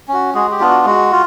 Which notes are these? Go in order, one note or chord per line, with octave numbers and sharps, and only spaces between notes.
C#4 F#4
G#3 F#4 G#4
G4
B3 D4 F4
F#4
G#3 F#4
F4